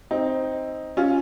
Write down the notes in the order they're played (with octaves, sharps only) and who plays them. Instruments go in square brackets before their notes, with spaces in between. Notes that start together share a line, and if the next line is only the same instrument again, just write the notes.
[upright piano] C4 D#4
C#4 F4